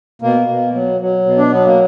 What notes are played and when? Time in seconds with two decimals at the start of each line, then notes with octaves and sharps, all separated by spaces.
0.22 B2 A#3
0.48 B2
0.74 F#3
1.01 F#3
1.26 B2
1.38 D4
1.52 F#3 B3
1.65 A#3